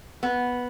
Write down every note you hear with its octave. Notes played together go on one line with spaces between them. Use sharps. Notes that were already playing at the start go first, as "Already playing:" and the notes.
B3